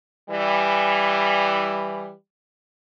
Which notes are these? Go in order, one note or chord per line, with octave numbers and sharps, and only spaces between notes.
E3 G3